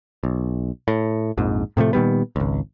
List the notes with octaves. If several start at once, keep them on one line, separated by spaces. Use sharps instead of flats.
B1
A2
A#1 F2 G#2
A2 C3 F3 A3
A#2 D#3 G3 B3
G#1 C#2